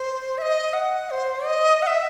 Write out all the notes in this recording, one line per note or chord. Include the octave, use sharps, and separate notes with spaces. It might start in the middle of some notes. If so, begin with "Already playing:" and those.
Already playing: C5
E5
D#5
F#5
C5
D#5
F#5
E5